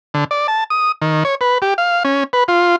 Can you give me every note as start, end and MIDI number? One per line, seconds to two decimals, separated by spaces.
0.14 0.24 50
0.31 0.47 74
0.48 0.64 81
0.70 0.92 87
1.02 1.24 51
1.25 1.35 73
1.41 1.58 71
1.62 1.74 67
1.78 2.03 77
2.05 2.24 61
2.33 2.44 71
2.48 2.76 65